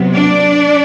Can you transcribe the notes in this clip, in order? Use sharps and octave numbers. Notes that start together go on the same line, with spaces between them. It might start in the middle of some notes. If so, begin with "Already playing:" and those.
Already playing: C3 F#3 B3
D4 D5